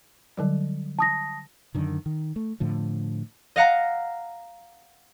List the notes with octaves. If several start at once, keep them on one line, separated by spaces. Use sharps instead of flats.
D3 F#3 G3
A5 D#6 A#6
F#2 D3 D#3
D#3
A3
A2 D3 F3
D#5 F5 F#5 A#5